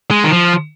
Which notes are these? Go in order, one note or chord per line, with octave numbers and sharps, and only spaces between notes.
G#3
D#3
F3